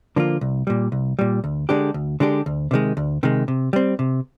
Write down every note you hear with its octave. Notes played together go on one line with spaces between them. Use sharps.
D3 F3 A#3 F4
C2
A#2 G3
C2
A#2 G3
D2
D3 G#3 D4 G4
D2
D3 G#3 D4 G4
D2
C3 D#3 G#3
D2
C3 D#3 G#3
C3
G3 C4
C3